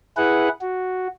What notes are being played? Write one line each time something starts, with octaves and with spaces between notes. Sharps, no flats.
E4 G#4 B4 F#5
F#4